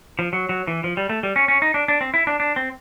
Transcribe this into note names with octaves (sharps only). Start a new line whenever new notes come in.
F3
F#3
F#3
E3
F3
G3
A3
G3
C#4
C#4
D#4
D4
D4
C4
E4
D4
D4
C4